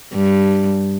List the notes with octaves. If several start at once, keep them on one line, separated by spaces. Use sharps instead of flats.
G2